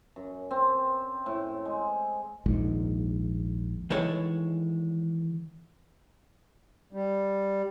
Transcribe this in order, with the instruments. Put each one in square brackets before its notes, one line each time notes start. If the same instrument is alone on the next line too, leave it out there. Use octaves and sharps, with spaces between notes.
[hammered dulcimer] F#2
C4
A2
G#3
[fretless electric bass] A#1 D#2 G#2
[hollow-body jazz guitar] D#3 E3 G#3 A4 C#5
[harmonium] G3